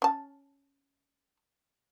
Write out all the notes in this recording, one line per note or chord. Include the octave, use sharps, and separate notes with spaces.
C#4 A5